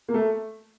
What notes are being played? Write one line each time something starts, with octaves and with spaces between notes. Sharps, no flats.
A#3
A3